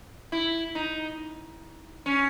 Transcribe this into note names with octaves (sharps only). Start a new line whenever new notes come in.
E4
D#4
C#4